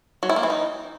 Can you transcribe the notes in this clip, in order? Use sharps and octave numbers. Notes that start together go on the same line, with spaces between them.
F#3
E4
A#3
E3
D#4